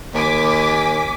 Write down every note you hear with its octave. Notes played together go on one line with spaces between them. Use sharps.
D#2 G#5 D6 B6